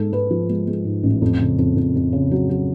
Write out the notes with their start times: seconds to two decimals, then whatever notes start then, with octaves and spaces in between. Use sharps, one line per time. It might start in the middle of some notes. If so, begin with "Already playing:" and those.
Already playing: G#2 G#3 A4
0.12 G#2 B4
0.30 F3
0.49 G#3
0.67 G#3
0.85 G#2
1.03 A1
1.22 F2
1.40 C#3
1.59 F2
1.77 F2
1.95 F2
2.12 C#3
2.31 F#3
2.49 F#3